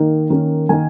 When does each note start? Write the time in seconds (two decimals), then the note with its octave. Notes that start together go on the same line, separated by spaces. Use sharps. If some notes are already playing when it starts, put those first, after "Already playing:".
Already playing: D#3 A#3 D#4
0.30 D#3 A#3 C#4
0.69 D#3 A#3 D#4 G#5